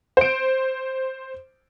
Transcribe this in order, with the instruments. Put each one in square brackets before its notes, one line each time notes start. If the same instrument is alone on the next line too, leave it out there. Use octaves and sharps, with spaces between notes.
[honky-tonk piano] C5 D7